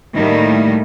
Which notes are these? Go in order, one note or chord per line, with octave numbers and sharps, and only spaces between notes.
A2 D#3 G3 A3 A#3 E4